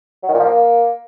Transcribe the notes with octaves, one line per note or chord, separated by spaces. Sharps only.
F#3
D#3
A#2
F3
A#3